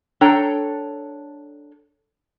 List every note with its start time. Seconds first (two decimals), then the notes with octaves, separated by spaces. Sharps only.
0.21 D4 A4 C#5 G5 A#5